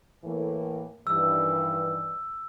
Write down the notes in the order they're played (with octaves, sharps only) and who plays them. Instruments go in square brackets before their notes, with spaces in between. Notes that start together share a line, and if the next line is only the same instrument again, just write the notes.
[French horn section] A2 E3 A#3
[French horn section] G2 D#3 E3 [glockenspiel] E6